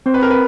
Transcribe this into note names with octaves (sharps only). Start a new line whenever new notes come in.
C4 C5
B4
A#4
B4